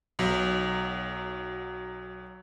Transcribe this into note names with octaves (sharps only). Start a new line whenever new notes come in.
B1 F#3